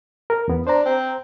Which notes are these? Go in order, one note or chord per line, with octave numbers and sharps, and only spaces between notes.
A#4
E2 B3
D4 C5 A#5
C4